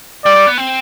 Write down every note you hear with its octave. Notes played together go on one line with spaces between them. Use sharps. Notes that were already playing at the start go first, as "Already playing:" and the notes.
G3 D5
G3
B3
C4